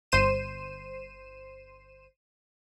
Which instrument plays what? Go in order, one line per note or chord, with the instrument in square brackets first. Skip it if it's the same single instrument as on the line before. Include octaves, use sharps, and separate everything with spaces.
[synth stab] G1 C5 C7 D#7 E7